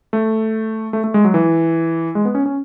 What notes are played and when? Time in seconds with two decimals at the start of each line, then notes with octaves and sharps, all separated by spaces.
0.13 A3
0.93 A3
1.04 A3
1.14 G#3
1.25 F#3
1.34 E3
2.15 G#3
2.25 B3
2.35 C#4
2.46 C#4